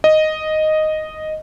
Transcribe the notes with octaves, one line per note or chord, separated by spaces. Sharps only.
D#5